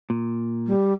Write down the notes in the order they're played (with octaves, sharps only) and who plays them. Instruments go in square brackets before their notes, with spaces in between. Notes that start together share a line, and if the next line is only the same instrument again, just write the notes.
[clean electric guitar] A#2
[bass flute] G3